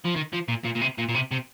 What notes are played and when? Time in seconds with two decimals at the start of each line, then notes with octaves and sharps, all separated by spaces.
0.04 F3
0.15 D#3
0.33 F3
0.49 A#2
0.65 A#2
0.76 A#2
0.81 C3
0.98 A#2
1.09 A#2
1.15 C3
1.31 C3